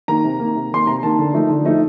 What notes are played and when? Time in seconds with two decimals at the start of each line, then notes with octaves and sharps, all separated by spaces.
0.08 D#3 A#3 A#5
0.24 C3
0.40 D#3 A#3
0.56 C3
0.72 D#3 A#3 C6
0.87 C3 A#5
1.03 D#3 A#3 A5
1.19 D3
1.34 F3 A3 D#4
1.50 D3
1.65 F3 A3 D#4